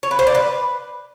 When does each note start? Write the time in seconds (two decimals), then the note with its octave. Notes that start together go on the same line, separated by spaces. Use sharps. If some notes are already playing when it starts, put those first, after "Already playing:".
0.03 C#5
0.11 B4
0.19 C5
0.27 D5
0.35 B4